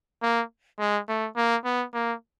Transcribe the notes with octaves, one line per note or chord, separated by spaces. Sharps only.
A#3
G#3
A3
A#3
B3
A#3